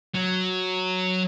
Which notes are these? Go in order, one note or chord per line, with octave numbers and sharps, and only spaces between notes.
F#3